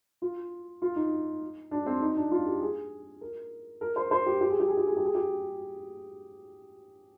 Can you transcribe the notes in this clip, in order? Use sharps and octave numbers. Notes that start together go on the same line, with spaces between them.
F4
F4
D#4
D4
C4
D#4
D4
F4
G4
G#4
A#4
A#4
C5
C5
G4
G4
G#4
G4
G#4
G4
G#4
G4
G#4
G4